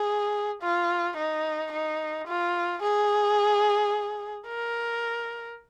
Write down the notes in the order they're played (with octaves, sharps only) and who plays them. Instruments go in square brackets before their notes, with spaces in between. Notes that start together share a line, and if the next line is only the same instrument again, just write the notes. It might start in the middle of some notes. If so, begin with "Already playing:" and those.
Already playing: [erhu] G#4
F4
D#4
D#4
F4
G#4
A#4